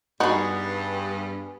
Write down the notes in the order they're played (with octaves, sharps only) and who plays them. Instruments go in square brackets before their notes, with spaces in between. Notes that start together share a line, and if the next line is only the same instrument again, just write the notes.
[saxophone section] G2 [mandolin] B3 G#4 [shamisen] D#4 F#4